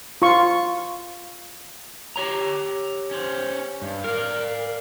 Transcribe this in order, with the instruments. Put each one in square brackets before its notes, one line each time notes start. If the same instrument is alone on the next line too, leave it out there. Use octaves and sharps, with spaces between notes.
[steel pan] F4 C#6
[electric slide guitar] G4 C#5 A#5
[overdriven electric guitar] C#4 C5
G2
[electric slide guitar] A#4 [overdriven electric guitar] D5 F5